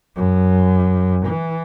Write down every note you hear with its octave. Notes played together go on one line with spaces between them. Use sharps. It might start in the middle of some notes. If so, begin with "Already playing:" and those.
F#2
E3